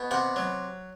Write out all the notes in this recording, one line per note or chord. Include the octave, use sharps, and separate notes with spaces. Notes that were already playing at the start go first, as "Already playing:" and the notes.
Already playing: B2
C3 F#5
F#3